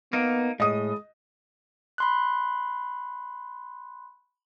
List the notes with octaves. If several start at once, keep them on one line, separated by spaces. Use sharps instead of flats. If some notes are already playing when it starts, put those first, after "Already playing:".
A#3 B3 D#4
A2 G#3 D#5 D#6
B5 C6 F#6